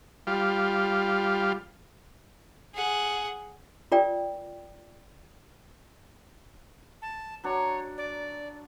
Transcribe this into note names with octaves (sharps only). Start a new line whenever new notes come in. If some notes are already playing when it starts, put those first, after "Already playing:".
G3 F4
G#4 F#5
F4 A#4 D5 G5
A5
F#3 D4 C#5
D5